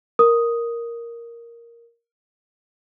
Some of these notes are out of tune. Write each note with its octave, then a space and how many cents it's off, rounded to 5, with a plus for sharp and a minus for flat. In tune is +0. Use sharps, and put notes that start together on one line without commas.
A#4 +0 D#6 +0